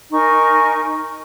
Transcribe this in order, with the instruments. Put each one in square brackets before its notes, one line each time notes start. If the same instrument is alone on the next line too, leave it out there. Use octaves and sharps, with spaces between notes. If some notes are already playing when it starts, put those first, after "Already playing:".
[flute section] D#4 A#4 G#5 C#6